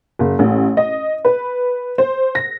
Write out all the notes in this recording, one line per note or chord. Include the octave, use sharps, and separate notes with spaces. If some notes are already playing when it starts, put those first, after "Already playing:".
F#1
A1
D#5
B4
C5
A#6